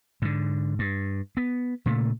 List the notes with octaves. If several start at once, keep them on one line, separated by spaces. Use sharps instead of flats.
G#2 D3
G2
B3
A#2 C#3 A3